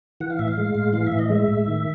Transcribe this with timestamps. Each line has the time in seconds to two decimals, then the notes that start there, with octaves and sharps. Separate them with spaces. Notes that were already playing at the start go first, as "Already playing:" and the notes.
0.20 E3 F#5
0.30 F5
0.39 A2 E5
0.48 F5
0.57 G#3
0.75 A2
0.93 E3 F5
1.07 E5
1.12 A2
1.19 D#5
1.30 G#3 E5
1.49 A2
1.67 D#3